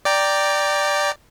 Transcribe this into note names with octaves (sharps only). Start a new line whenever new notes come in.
D5 G5 A#5